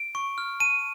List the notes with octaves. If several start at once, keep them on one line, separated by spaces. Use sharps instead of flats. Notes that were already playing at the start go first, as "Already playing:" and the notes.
Already playing: D7
C#6
F6
A5 D#7